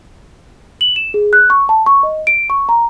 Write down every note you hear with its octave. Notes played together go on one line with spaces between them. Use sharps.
F#7
E7
G#4
F#6
C#6
A5
C#6
D#5
D7
C#6
A#5